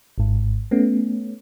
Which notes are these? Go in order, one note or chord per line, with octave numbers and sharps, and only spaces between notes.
G#1 G#2
A3 B3 C#4